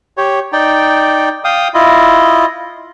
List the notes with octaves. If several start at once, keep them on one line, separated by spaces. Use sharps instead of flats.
G4 C#5
D#4 D5 G5
F5 G5 D#6
E4 F4 D#5